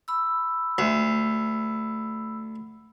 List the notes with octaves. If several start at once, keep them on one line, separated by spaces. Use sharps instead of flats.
B5 E6
D2